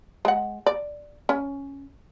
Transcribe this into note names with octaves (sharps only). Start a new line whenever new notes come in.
G#3 F#5
D5
C#4